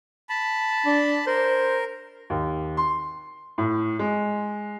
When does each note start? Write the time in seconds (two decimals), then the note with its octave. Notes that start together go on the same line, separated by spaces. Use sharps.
0.29 A5 B5
0.86 D4
1.27 A#4 C5
2.30 D#2
2.77 C6
3.58 A2
3.99 G#3